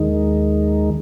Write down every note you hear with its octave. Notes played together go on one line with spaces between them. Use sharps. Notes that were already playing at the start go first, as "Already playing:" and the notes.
Already playing: D#2 D#3 G#3 D#4